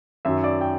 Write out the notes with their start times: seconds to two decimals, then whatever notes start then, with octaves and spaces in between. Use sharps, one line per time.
0.25 F#2 D#3 F#3 E5
0.44 D5
0.61 G5